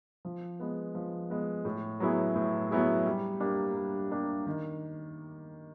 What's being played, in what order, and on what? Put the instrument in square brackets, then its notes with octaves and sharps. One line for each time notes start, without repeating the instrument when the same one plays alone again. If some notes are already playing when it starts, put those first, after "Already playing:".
[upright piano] F3
G#3 B3
F3
G#3 B3
A2
F#3 B3 E4 G#4
A2
F#3 B3 E4 G#4
G3
A#3 D4 G4
G3
A#3 D4 G4
D#3